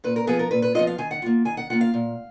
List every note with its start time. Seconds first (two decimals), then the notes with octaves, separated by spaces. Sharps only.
0.04 A#2 B4
0.16 A#4
0.27 F3 B3 F4 G#4
0.39 A#4
0.51 A#2 B4
0.62 B4
0.75 F3 B3 F4 D#5
0.87 F5
0.98 D#3 G#5
1.11 F#5
1.22 A#3 F4
1.45 D#3 G#5
1.57 F#5
1.70 A#3 F4 F#5
1.81 F5
1.94 A#2